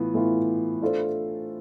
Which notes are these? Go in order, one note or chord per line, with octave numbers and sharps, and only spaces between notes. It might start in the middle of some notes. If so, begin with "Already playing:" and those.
Already playing: A2 E3 B3 F4
A2 E3 B3 F4
A3 D4 F4 A4 C5